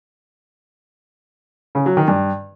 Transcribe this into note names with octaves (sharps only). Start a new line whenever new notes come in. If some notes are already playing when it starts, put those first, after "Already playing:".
C#3
F#3
D#3
G2